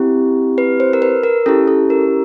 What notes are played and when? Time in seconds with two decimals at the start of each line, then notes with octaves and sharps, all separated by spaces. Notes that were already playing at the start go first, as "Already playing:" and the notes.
Already playing: C4 E4 G4
0.58 B4
0.80 C5
0.93 A#4
1.02 B4
1.23 A#4
1.46 C#4 E4 G4 A4
1.68 A4
1.90 A#4